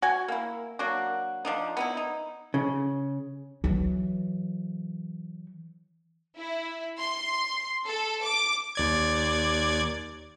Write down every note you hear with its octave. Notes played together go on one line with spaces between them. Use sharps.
F#4 G#5
A#3 E4
F#3 A#3 D4 F#4
F3 D4 D#4
B3 D#4 E4
D#4
C#3
E3 F#3
E4
C6
A4
D6
D#2 D5 G#6